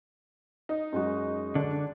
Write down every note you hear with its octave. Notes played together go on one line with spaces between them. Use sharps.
D#4
F#2 G#3 F#4
D3 D4